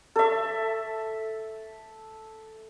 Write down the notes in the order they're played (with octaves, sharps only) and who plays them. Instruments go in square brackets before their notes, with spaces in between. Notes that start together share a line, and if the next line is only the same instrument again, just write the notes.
[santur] A4 E5